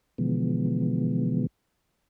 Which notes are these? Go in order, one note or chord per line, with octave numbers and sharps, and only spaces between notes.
B2 D3 E3 F3 G#3 B3